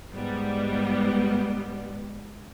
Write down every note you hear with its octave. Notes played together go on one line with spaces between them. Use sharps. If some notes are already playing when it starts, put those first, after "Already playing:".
G#2 G3 B3